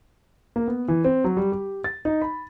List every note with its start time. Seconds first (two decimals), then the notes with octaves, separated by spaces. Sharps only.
0.56 A#3
0.68 B3
0.88 E3
1.05 C4
1.24 F#3
1.37 G3
1.52 G4
1.84 A6
2.05 D#4
2.22 B5